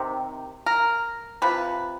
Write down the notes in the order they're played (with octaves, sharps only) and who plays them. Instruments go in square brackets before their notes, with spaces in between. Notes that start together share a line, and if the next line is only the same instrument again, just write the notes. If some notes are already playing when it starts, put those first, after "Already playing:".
Already playing: [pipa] C3 D#3
A#4
C3 F3 B4